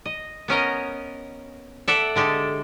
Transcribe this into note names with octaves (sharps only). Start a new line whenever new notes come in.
D#5
B3 C#4 A#4 D#5
A4 D5 E5 F#5
D3 G#3 G4 A4